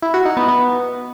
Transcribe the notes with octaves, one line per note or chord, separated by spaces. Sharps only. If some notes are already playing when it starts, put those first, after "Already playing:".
E4
F#4
D#4
B3
B3